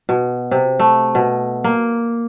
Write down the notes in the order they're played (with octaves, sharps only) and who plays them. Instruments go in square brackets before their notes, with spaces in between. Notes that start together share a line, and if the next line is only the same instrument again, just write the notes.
[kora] B2
C3
A3
B2
A#3